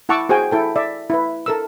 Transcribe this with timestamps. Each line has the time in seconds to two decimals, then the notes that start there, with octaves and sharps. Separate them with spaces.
0.09 E4 F#5 A5 C#6 D6 E6
0.29 F#4 G#4 C5 G5 G#5
0.52 E4 A4 G5
0.76 D5 E5
1.10 E4 B4
1.46 A4 A#4 E6